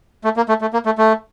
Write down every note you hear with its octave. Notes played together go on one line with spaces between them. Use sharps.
A3
A#3
A3
A3
A#3
A3
A3